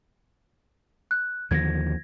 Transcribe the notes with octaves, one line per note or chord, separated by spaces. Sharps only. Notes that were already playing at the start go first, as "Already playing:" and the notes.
F#6
D#2 D3 F3 G#6 A#6